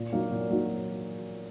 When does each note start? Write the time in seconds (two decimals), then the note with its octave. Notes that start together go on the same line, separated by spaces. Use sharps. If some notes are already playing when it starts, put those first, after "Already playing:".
Already playing: A#2
0.12 F#3 A#3 D#4
0.32 A#2
0.50 F#3 A#3 D#4